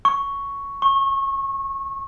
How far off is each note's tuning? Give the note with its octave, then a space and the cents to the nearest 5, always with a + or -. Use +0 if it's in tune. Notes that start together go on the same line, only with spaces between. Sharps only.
C#6 +5
C#6 -25